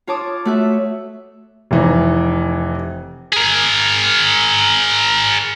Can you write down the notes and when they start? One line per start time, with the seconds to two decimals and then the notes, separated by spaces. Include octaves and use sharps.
0.07 F4 C#5 A5 D6 D#6
0.45 A3 F#4 E5
1.71 F1 E3 D#4
3.33 G#4 A#4